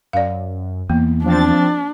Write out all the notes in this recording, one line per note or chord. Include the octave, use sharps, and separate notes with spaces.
F#2 D5 F5
E2 A#3
F3 C4 D4 A6